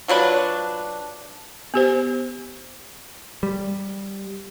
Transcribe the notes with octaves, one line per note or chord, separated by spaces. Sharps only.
F3 F#3 D4 B4
B3 G4 C5
G3